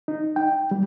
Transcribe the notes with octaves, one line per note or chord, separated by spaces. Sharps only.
D#4
G5
G3